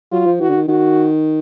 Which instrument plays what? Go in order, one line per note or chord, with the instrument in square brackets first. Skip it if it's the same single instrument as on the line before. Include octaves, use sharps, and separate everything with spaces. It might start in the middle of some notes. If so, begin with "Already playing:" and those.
[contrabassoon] F#3 [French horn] F4
[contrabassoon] F3
[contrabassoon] E3 [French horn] F#4
[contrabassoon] D3
D#3
[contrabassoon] D#3 [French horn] F#4